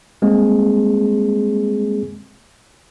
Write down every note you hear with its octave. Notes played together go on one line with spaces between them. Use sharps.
G3 G#3 A#3 C4 G#4